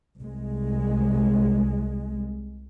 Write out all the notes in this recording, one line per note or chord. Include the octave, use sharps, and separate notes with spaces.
C2 G#3